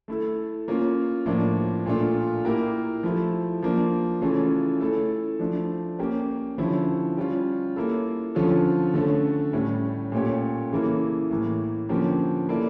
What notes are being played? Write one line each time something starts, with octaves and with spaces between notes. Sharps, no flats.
A3 E4 A4
A#3 C#4 F4
A2 F3 A#3 D4
A#2 A3 D4 F4
A#3 E4 G4 A#4
F3 A3 E4
F3 A#3 D4
C#3 E3 A3 C#4 F4
A3 E4 A4
F3 A3 D4
A#3 C#4 G4
D3 F3 C#4 E4
G3 C#4 F4
A#3 E4 A4
D3 F3 C#4 F4 A4
D3 A3 C#4
A2 G3 C#4
A#2 A3 C#4 G4 C#5
C#3 E3 A#3 E4 A4
A2 E3 A#3
D3 F3 A#3 C#4 G4
A#3 E4 A4 D5